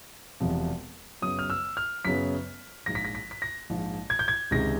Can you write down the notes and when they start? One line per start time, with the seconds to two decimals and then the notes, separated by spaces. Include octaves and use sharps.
0.40 E1 E2 C3 F3
1.22 F#2 C#3 F#3 B3 D#6
1.39 F6
1.50 E6
1.77 F6
2.05 F#2 C#3 F#3 B3 B6
2.86 A#1 G#2 F3 A#6
2.95 B6
3.05 A#6
3.15 B6
3.31 B6
3.42 A#6
3.70 A#1 G#2 F3
4.10 G#6
4.19 G6
4.28 G#6
4.51 C#2 C3 D#3 G#3 A#6